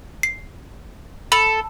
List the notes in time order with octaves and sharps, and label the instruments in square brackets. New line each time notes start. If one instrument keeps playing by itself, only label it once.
[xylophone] C7
[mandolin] A4 [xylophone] B5 F#7